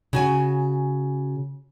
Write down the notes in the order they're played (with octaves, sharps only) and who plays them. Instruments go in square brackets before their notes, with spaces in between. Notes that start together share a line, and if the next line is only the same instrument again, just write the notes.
[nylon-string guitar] C#3 F#4 G#5